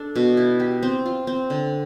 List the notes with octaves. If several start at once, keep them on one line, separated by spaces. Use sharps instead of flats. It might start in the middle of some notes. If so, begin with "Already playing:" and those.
Already playing: D4 A4
B2
E4
G4
C4
F4
C4
D3